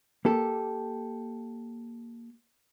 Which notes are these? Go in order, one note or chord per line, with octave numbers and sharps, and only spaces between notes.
A#3 G4 A4